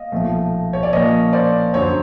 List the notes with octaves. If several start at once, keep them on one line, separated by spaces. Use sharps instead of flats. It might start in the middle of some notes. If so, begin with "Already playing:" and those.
Already playing: D#5 F5
B1 A#2 F3 A3
C#5
D5
A#2 F3 A#3 C#4 C#5 D#5
C5 D5
F#2 D3 F#3 C#5
C5